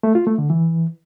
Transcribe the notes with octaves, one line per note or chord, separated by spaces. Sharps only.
A3
F4
A3
D3
E3